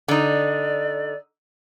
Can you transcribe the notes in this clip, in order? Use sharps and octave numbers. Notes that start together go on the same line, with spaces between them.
D3 D#4 D5